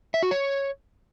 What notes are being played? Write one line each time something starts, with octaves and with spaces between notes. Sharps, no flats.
E5
F#4
C#5